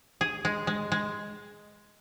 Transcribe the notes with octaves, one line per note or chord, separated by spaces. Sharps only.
G#4
G#3
G#3
G#3